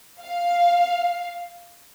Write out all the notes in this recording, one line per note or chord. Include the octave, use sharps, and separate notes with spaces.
F5